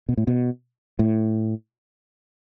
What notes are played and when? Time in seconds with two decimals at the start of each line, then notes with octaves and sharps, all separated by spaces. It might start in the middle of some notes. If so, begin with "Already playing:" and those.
0.09 B2
0.17 A2
0.27 B2
0.99 A2